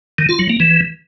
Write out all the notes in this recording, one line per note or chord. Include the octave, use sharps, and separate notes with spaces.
D#3
F4
F#3
A#3
E3